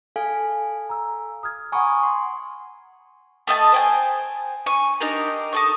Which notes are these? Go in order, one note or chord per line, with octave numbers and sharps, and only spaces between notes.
A4 F5 G#5
A#5 E6
D#6 F6 G#6
F#5 G#5 A#5 B5 C#6 D#6
C6
A3 D#5 G5 A5
C5 G5 G#5
G#5 C#6
D4 D#4 G4 A#4
D#4 A4 C#6